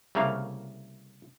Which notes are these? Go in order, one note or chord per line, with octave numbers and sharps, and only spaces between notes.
C2 C#3 A3 A#3 F5